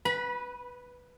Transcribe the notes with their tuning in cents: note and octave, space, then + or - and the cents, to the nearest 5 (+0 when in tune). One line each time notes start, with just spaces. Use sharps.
B4 +0 B5 -30